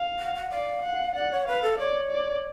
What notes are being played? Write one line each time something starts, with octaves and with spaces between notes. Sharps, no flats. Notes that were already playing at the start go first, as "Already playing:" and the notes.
Already playing: F5
F#5
F#5
D5 F5
F#5
D5 F#5
C#5
B4 F5
A4
C#5 D5
D5